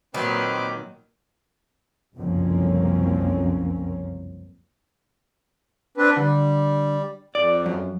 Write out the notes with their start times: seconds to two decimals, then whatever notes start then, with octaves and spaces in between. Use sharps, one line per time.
0.14 A#2 D#3 F#3 C4 B4 D6
2.17 F#1 C2 F2 A#3 C4 C#4
5.97 C4 D4 B4
6.17 D3 G3
7.35 F2 D5
7.66 F#2